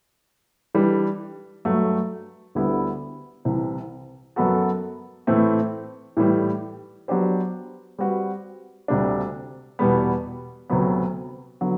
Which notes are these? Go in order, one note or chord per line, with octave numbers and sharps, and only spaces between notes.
E3 G3 D4
G2 F#3 A3
D2 D3 G3 B3 E4
C2 C3 E3
F#2 F#3 B3 F#4 A4
A2 E3 A3 C4
A2 E3 G3
F#3 B3 D4 G4 C5
G3 C4 F#4 B4
D2 C3 G3 D4
E2 B2 G3 B3
D2 C3 F#3 B3
D3 F#3 B3